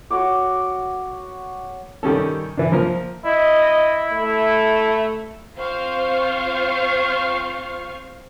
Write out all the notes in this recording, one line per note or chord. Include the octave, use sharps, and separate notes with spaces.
F#4 C#5 F#5 D6
D#3 G3 C#4 A4
E3 D4
F3 A#3 A#4
E4 D#5
A3
C4 F4 C5 F5 C#6 C7